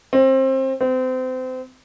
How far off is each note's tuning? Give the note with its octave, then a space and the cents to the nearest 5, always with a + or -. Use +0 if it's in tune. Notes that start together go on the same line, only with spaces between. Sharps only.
C4 +25
C4 -30